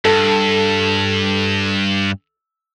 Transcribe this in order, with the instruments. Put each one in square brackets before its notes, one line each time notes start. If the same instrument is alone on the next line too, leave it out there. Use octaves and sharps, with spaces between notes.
[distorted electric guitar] G2 [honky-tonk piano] A4